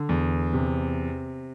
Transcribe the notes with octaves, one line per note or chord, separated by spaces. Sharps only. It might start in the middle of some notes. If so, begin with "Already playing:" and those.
Already playing: D3
E2
C3